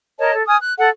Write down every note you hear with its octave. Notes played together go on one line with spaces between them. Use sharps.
A#4 C#5 D#5 A5
A4
G#5 D#6 F6
F#6
A4 F#5